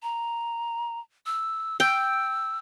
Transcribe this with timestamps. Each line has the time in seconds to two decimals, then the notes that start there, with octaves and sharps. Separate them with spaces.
0.03 A#5
1.26 E6
1.80 G5 E6